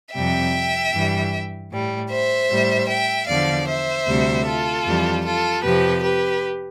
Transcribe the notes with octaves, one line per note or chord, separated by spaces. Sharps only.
F2 C3 G3 E5 G5
G2 E3 G3
A2 G3
C5 E5
A2 G3
E5 G5
E2 D3 F3 D5 F5
C5 E5
D2 C3 G3
F4 A4
F2 E3 G3
F4 A4
F2 C3 F3 G4 B4
G4 B4